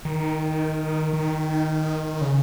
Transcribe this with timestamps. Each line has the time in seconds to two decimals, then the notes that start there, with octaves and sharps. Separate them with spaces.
0.05 D#3
1.13 D#3
2.21 C#3